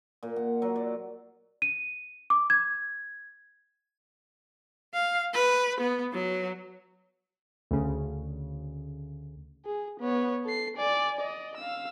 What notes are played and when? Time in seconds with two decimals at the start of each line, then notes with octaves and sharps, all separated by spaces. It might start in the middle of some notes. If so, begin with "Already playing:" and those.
0.23 A#2
0.36 F#5
0.62 F#3
0.76 D5
1.62 D#7
2.30 D6
2.50 G#6
4.94 F5
5.34 B4
5.80 B3
6.13 F#3
7.71 D2 C#3
9.65 G#4
10.00 B3 C#5
10.45 A4 C7
10.77 D5 G#5
11.20 D5 D#5
11.57 F5 E6